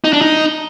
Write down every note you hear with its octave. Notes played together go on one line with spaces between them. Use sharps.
D#4
D4
D#4